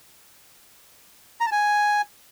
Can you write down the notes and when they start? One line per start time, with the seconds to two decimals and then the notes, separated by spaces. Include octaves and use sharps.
1.41 A#5
1.46 A5
1.52 G#5